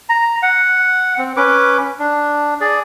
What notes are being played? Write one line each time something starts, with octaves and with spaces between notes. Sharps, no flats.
A#5
F#5
C4
C#4 B4 D6
D4
G#4 D5